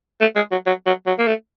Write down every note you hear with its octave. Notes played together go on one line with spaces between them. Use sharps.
A3
G#3
F#3
F#3
F#3
F#3
A#3
A3